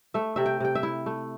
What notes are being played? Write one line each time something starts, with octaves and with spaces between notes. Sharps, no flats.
A3 E5
C3 E5
G5
C3 G5
E5
E4
A3